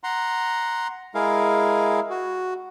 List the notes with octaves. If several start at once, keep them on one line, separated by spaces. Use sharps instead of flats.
F#5 A#5 C6
G#3 E4 G#4 A#4 F5
F#4